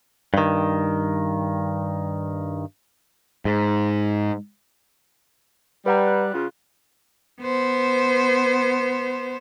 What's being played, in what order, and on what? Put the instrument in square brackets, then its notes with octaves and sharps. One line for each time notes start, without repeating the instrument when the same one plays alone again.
[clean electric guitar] G2 D#3
[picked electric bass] G#2
[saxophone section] G3 [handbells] B4 F#5 A#5
[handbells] F#6
[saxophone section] C#3 F4
[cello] B3 C5